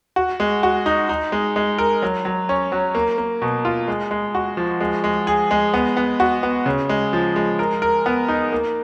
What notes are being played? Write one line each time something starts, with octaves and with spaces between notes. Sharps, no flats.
F#4
G#3
F#4
D#4
D#4
G#3
G#3
A#4
F#3
F#3
C#4
F#3
A#3
A#3
B2
F4
G#3
G#3
F#4
F3
G#3
G#3
G#4
G#3
B3
B3
F#4
B3
C#3
G#3
F3
G#3
A#4
A#4
B3
D#4
A#3